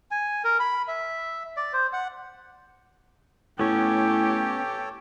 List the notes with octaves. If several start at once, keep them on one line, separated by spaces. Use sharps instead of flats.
G#5
A#4
B5
E5
D5
C5
F#5
A2 B3 C#4 G4 A4 C#5